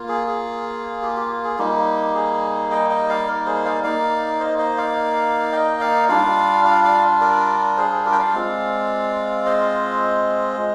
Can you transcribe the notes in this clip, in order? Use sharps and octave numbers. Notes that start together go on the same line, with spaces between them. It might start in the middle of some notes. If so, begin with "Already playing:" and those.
Already playing: A#3 F4
G#4
G#4
G4
G4
G#4
G3 A#3 D#4 G4
G#4
D#5 G5
D#5 G5
D5 F5
A#4 D5
G#4 C5
D5 F5
A#3 D#4 D5 F5
C5 D#5
C5 D#5
D5 F5
D#5 G5
D5 F5
G3 D4 F4 D5 F5
D5 F5
D5 F5
A#4 D5
G#4 C5
G#4
G4 A#4
G5
D5 F5
G#3 C4 F4
C5 D#5
G#3